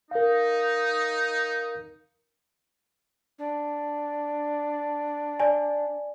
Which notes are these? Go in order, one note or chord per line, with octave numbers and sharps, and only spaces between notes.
D#4 A#4 F5
D4
D5 G#5